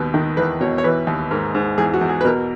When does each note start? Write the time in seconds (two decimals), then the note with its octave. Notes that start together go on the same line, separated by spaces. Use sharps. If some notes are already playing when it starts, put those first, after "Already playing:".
Already playing: D#2 B2 B4
0.14 D#3
0.37 E2 B4
0.61 B2 C#5
0.78 C#5
0.84 E3 B4
1.07 D#2
1.31 G#2 A#4
1.55 G#2
1.78 E2 G#4
1.94 F#4
2.01 E2
2.09 G#4
2.21 B4
2.24 B2 A#4